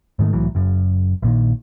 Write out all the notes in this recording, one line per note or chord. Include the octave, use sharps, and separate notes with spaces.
G#2 D#3 A3
C2 A2 E3 F#3
F#1 F#2
A#1 A#2 D#3